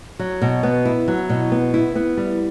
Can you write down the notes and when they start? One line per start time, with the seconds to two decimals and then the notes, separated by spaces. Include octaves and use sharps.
0.19 F#3
0.42 B2
0.63 B3
0.85 E4
1.08 F#3
1.29 B2
1.52 B3
1.74 E4
1.95 B3
2.17 G3